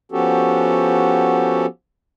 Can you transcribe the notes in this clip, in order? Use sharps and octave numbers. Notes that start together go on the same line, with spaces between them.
F3 B3 C#4 F#4 G4 A4